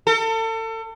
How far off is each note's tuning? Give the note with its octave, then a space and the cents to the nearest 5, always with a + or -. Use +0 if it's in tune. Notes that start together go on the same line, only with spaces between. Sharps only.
A4 +35